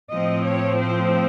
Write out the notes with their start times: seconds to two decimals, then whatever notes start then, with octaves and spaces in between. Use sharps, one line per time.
0.12 A2 F3 C4 D#5
0.45 C#5
0.79 C5